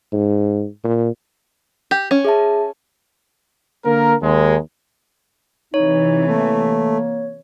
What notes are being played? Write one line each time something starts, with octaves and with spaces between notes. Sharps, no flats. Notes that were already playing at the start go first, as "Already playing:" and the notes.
G#2
A#2
G4
C#4
G#4 E5 A5
D3 A#3 A#4
D#2 G#3
C3 E3 D#4 C#5
A3 A#3